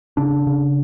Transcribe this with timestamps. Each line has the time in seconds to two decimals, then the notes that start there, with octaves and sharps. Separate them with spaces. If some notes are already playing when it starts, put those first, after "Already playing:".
0.17 C#3 D4
0.47 C#3